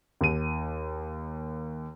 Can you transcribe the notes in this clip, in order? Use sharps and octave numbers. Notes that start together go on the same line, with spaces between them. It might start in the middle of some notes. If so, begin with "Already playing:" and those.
D#2 D#7